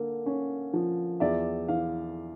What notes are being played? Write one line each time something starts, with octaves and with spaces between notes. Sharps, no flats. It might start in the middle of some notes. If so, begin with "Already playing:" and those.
Already playing: D3 A#3
C#4
F3
E2 D5 E5
E3 F5